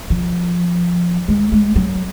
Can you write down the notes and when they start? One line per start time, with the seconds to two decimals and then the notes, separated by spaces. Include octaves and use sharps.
0.10 F3
1.28 G#3
1.52 G#3
1.76 F#3